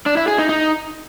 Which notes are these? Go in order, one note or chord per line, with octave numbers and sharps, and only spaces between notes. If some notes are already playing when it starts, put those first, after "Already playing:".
D4
E4
G#4
D#4
D#4